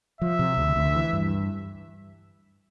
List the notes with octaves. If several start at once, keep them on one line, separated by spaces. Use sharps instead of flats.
F3 E5
C3
D2
D2
E3
G2